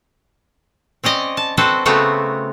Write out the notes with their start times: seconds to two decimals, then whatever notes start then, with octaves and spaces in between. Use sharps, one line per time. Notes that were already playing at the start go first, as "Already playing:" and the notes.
1.04 C4 C#4 D5 D#5
1.37 A5
1.57 C4 F#4 A4 B4 C5 A5
1.86 C#3 A3 B3 C4 F#4